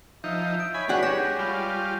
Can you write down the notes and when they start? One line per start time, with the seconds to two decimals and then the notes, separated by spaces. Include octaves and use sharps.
0.24 F3 D#4 E5 G6
0.60 D7
0.74 C#5 G#5 B5
0.89 C#4 D4 F#4 G#4 B4 F#5 G#5
1.03 G#3 G4 C#5 A#6 C#7 E7
1.39 G3 F4 B5 C#6